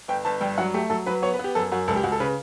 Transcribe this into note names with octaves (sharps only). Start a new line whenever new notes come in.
G1 G5
G1 A5
G2 G5
F#3 F#5
A3 G4
F#3 A4
F#3 B4
B3 C#5
B4
B3 G4
F#2 A4
F#2 F#4
C#2 A4
G4
C#2 F#4
A4
C#3 B4